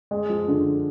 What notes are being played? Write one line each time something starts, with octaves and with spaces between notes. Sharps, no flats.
G#3
F3
D3